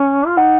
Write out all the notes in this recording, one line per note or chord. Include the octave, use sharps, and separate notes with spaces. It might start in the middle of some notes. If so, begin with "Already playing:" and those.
Already playing: C#4
F4
D#4 F#5